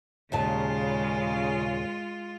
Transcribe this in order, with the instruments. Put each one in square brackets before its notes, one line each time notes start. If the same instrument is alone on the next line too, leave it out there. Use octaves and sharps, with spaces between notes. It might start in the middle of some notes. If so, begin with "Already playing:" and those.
[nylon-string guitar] D#2 A#2 A5 [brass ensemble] C#3 [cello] G#3 F4